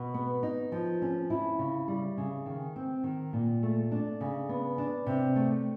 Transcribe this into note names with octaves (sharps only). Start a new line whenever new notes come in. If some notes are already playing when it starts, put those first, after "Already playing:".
Already playing: B2
B3
D#4
F3
C#4
E4
C#3
G3
C#3
D#3
C4
D#3
A#2
A3
D4
C#3
B3
D4
C3
A3